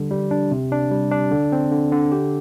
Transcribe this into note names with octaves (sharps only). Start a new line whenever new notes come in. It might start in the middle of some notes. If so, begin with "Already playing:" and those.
Already playing: D3 G3
G3
D4
C3
D4
G3
D4
D3
C4
D3
D3
G4